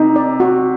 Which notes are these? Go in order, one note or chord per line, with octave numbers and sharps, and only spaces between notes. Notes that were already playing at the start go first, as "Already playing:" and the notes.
Already playing: C3 D#4
D5
F#4